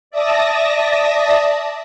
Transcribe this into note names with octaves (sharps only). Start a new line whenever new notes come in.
D5 E5 A5 D#6 A#6